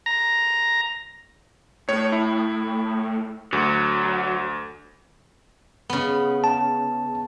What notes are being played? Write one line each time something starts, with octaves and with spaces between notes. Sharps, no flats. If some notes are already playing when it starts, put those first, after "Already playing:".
A#5
A2 C#5
E4
D2 F#3
C#3 B3
A5